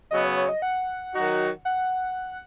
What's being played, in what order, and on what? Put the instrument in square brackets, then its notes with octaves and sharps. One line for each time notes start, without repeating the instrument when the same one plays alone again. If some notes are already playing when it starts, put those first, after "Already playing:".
[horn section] C#3 F#3 B3 [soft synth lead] D#5
[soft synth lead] C#5
C#5
D#5
F#5
[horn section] D#3 F#3 D#4 F#4
[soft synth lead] F#5